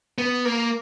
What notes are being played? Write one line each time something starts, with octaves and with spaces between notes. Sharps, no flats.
B3
A#3